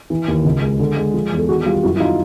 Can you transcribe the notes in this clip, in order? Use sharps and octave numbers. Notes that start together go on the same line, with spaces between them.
E3
D#2
C#2
G#3
D3
G#3
F3
E2
A4
D#3 F#4 G#4
G3 F4 G4
F#2 E4 F#4
E4
F#3 D#4 F4